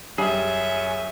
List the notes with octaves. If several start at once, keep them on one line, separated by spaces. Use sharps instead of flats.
F#2 G3 C#4 G#4 E5